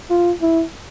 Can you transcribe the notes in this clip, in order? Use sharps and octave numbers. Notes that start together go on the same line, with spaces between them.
F4
E4